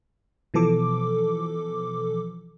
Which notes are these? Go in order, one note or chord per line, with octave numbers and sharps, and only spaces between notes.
B2 E3 F3 A4 D6